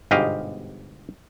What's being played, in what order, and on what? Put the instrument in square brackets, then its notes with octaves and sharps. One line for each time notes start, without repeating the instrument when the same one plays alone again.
[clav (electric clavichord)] G1 G#2 B2 G4 D#5 F5